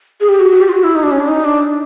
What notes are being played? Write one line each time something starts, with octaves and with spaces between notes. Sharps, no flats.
G#4
G4
F#4
F#4
G4
F4
F#4
E4
D#4
D4
C#4
D4
D#4
D4